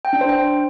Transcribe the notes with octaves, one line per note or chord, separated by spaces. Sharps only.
G5
D4
C5
G5